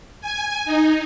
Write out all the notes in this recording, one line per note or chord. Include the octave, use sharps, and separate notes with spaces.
G#5
D#4